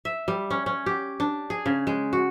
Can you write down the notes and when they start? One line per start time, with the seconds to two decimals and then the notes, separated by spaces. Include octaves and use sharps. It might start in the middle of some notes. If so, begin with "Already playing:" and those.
0.05 E5
0.28 G3
0.50 C#4
0.66 C#4
0.86 G4
1.20 D4
1.50 G#4
1.66 C#3
1.87 G#3
2.13 F#4